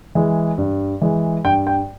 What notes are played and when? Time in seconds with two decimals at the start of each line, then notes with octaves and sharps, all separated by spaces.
0.15 E3 G#3
0.58 G2
1.01 E3 G#3
1.44 G2 G5
1.67 G5